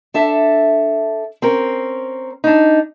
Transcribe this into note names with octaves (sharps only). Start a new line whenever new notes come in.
D4 A4 E5
C4 C#4 A#4
D4 D#4